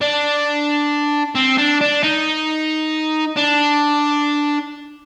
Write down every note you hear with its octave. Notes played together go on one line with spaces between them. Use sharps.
D4
C4
D4
D4
D#4
D4